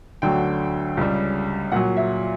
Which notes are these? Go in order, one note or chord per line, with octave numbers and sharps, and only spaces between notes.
D2 D3 F#3 G5
C#2 C#3 G3
A#2 F#3 F#5
E5